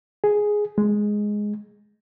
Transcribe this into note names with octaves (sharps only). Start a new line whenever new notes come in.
G#4
G#3